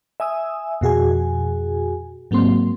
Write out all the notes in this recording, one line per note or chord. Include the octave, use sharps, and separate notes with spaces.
E5 G#5 D#6 E6
F2 B2 F#4 G#4 G#5
G#2 F#3 A#3 C4 C6